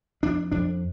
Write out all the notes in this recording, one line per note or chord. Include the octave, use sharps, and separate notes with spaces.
F2 D4
F2 D4